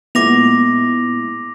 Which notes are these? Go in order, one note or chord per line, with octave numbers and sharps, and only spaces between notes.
A#2 G#3 B3 E4 D6 A#6 F7